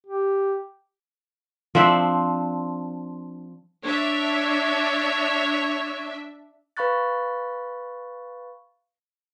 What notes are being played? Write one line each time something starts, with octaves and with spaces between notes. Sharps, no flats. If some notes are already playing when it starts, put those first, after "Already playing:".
G4
F3 C4 D4 E5
D4 C#5 E5
B4 F5 B5 C#6 F#6 A6